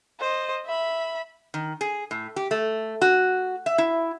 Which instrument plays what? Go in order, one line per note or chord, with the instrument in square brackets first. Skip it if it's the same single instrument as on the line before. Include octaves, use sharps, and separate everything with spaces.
[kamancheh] C5 D#5
E5 B5
[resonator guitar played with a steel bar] D#3
G#4
A2
G4
A3
F#4
E5
E4